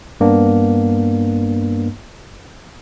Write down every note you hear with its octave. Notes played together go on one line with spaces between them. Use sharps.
G2 A#3 B3 D4